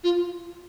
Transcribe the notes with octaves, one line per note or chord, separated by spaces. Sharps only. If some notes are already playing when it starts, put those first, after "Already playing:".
F4